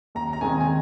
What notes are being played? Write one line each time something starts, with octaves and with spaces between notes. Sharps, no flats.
D#2 A#5
A#5
D#3 G#3 C4 G#5
G#5